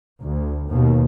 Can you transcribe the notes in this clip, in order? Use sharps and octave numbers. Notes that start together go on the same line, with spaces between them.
D2
D#2 B2